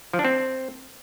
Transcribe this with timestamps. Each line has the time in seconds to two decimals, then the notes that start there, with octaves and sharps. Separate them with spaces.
0.13 F3
0.19 D4
0.25 C4